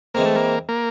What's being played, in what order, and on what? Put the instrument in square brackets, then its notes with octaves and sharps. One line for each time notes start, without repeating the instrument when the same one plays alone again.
[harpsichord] E3 G#3 C4 [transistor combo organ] A#3
[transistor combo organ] A3
A#3
A#3